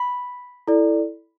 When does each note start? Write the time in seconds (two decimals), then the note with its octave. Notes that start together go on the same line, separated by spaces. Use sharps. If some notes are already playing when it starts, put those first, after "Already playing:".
Already playing: B5
0.68 E4 A4 D5